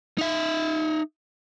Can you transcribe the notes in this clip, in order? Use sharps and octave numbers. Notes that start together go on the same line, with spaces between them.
D#4 E5